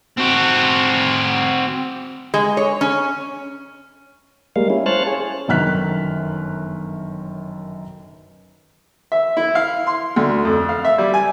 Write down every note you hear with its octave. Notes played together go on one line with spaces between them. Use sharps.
C4 F#4
G#3
C#5
C#4
G3 G#3 A#3 F5
C#4 E4
C5 C#5 F5 A5 F6 F#6
G#4 C#5
G1 F#2 D#3 F6 F#6 B6
E5
E4
F5
C6
D2
F2
F5
E5
G3
G#5